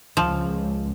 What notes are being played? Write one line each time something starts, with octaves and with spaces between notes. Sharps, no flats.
C#2 F3